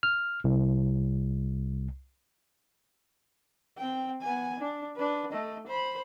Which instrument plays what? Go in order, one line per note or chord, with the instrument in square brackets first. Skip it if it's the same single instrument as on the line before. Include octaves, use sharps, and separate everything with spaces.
[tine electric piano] F6
C2
[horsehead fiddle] C4 G5
B3 G#5
D4
D4 B4
A3 D#5
C5 B5